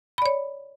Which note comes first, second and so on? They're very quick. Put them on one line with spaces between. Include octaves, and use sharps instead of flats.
B5 D5 C#5